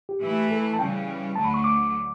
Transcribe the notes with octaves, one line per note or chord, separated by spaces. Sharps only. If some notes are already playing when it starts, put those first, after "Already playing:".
G4
E3 A3 E4
A4
A5
C#3 E3 G3 C#4 G5
D2 D3 F#3 A3 A5
B5
C#6
D6